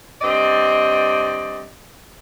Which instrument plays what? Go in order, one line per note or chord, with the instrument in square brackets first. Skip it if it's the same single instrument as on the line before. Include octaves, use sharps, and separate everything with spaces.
[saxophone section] G2 C4 D5 D#5